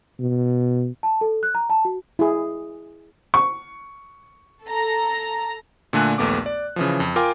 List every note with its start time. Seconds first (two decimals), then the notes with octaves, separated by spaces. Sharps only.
0.20 B2
1.03 A5
1.21 A4
1.43 F#6
1.55 A#5
1.70 A5
1.85 F#4
2.19 E4 G#4
3.34 C#6
4.66 A4 A#5
5.93 A#2 D3 A3 G#5 F#6
6.18 A#1 D#2 A3 B3 D6
6.46 D5
6.76 C#3 E3 F3
7.00 F2
7.16 F4 A#4 G5 G#5 D6